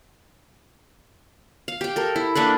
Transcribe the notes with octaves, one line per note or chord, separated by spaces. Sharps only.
F5
G4 G5
A4 A#4
E4
A#3 D4 A4 B4